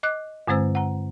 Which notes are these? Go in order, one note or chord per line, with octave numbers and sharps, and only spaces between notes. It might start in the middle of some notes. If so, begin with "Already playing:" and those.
D#5 D6 F#6
G2 D3 G#3 C4 C5 E6
F#5 A#5